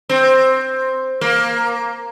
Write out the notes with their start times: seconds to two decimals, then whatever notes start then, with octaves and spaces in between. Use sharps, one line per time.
0.09 C4
1.21 A#3